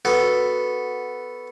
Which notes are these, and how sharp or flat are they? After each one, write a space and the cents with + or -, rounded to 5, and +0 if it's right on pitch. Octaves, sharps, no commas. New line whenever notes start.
B3 +0 F#4 +0 A4 +0